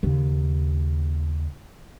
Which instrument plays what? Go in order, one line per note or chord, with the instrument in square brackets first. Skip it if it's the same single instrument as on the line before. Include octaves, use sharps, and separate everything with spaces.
[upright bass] D#2 C#3